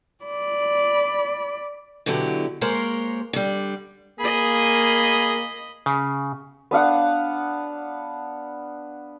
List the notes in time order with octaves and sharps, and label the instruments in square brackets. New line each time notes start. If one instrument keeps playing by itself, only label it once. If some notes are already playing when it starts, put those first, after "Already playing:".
[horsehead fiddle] D5 B5
[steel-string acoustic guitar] B2 D3 F#3 E4 G4
G#3 A#3 A#4 C5 C#5
D3 G3
[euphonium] A#3 [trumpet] G#4 [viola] D#5 B5
[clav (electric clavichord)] C#3
[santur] B3 D4 F5 F#5